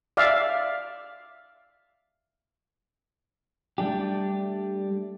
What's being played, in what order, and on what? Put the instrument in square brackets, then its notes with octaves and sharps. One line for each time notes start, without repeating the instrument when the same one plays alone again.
[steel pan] D5 E5 F5
[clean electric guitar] G3 A3 D4 G4